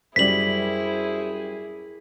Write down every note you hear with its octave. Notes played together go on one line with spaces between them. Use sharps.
F#2 G3 E4 G#4 C5 B6 F#7